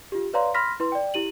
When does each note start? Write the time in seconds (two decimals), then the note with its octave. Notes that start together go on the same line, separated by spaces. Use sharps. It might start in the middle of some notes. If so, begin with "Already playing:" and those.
0.12 F4 G4
0.34 B4 C#5 D5 F5 A#5 C6
0.54 B5 C6 F6 A#6 B6
0.80 E4 B4 C6
0.92 D5 G5
1.14 E4 G4 D#7 F#7